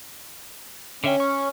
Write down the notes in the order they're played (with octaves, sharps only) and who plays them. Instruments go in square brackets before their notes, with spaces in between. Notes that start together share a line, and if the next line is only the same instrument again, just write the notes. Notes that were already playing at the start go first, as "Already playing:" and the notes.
[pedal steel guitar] D3 E5 G5 [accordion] C#4
[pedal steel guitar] C#6